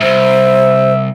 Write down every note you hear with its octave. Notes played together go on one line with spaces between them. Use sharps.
C2 G#2 C5 E5